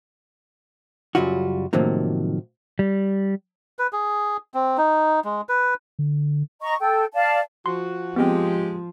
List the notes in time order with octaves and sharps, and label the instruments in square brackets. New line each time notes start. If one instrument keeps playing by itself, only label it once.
[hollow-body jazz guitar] F#2 C#3 F#3 G3 F4 F#4
A2 C3 D#3 F3 F#3 A#3
[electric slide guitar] G3
[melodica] B4
G#4
C4
D#4
G#3
B4
[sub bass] D3
[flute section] D#5 A#5 C#6
A4 G5
D5 F5 A5
[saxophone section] F3 F#4 [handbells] C6
[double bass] F3 [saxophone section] G#3 G4 [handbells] B3 C4